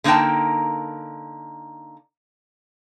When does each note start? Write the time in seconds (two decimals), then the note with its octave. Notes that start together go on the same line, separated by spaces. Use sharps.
0.04 D3 A#3 D#4 A#4 G5 A5